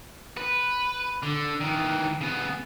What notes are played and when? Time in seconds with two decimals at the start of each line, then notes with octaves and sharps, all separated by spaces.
0.37 B4
1.23 D3
1.61 D#3 E3
2.21 C#3 B3